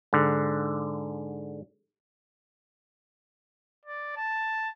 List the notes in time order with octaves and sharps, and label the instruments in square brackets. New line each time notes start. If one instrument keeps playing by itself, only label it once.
[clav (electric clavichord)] G#2 D3
[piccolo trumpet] D5
A5